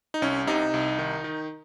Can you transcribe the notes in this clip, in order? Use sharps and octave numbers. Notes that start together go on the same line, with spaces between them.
D#4
C2 C#4
C3 D#4
C2
D#3
D#3